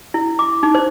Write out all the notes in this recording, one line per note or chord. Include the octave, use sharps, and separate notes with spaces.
E4
D6
D#4
C5